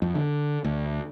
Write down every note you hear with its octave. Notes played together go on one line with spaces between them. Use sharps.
F2
D3
D2